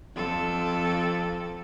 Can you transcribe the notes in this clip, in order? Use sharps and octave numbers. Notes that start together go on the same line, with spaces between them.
F2 A4